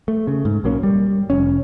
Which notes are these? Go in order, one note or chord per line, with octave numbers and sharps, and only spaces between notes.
A3
C#3 A3
G#2
B1 F#3 A#3 C#4
G3
F1 C#4